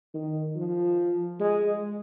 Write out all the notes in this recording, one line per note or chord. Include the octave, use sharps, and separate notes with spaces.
D#3
F3
G#3